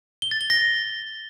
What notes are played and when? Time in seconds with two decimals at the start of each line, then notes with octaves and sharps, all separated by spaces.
0.22 G7
0.31 A6
0.41 G7
0.50 A#6